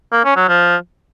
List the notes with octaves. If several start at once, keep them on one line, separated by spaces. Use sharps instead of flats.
A#3
C#4
F#3
F3